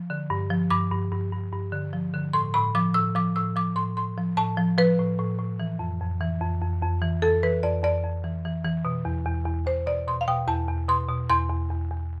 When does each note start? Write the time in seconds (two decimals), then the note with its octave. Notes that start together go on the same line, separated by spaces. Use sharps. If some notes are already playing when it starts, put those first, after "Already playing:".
Already playing: F3
0.10 D3
0.30 G2
0.51 F3
0.70 G2 D6
0.91 G2
1.12 G2
1.33 G2
1.52 G2
1.72 D3
1.93 F3
2.14 D3
2.33 A2 C6
2.54 A2 B5
2.75 F3 D6
2.94 A2 E6
3.15 F3 D6
3.36 A2 E6
3.56 F3 D6
3.76 A2 C6
3.97 A2 C6
4.17 F3
4.37 A2 A5
4.57 F3
4.78 F3 B4
4.99 A2
5.19 A2
5.39 A2
5.60 E3
5.79 F2
6.01 F2
6.20 E3
6.41 F2
6.62 F2
6.82 F2
7.02 E3
7.22 F2 A4
7.43 E3 B4
7.63 F2 D5
7.83 F2 D5
8.04 F2
8.24 E3
8.45 E3
8.64 E3
8.85 B2
9.05 E2
9.26 E2
9.46 E2
9.66 E2 C5
9.86 B2 D5
10.07 B2 C6
10.21 F5
10.28 B2 G5
10.48 E2 A5
10.68 E2
10.88 B2 C6
11.09 B2
11.30 E2 C6
11.49 E2
11.70 E2
11.90 E2